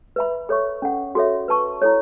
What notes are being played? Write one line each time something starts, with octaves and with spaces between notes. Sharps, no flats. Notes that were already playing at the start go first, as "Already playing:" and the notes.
B4 E5 B5
A4 C#5 E5 C#6
C#4 A4 F#5
F#4 A4 C#5 E5
B4 A5 C#6
E4 A4 C#5